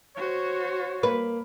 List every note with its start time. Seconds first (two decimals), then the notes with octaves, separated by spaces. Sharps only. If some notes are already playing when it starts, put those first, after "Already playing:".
0.17 F#4 C5 C#5
1.03 A#3 B4